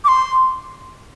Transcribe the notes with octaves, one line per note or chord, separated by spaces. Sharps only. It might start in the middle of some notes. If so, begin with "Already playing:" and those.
D6
C6